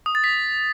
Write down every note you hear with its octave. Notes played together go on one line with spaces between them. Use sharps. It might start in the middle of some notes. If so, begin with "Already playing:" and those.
D#6
A6
B6